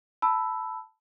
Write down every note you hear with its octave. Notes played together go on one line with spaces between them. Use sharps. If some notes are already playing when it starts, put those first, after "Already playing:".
A5 B5 E6